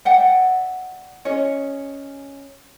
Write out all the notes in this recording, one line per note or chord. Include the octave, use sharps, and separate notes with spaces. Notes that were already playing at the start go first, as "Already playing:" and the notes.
D5 E5 F#5 G5
C#4 G#4 C#5 D#5